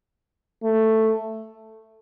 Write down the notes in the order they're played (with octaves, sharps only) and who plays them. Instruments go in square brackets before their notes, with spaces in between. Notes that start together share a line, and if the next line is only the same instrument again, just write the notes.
[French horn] A3